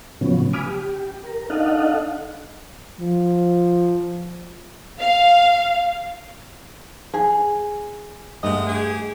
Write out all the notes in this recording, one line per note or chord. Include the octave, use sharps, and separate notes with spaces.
A2 C#3 F3 F#3 B3 C#4
G#5 B5 D6 D#6 F6
G4
A#4
D4 D#4 A4 D#5 F5 F#5
F3
F5
G#4
G2 G#3 A3 B3 D#5
G4 G#4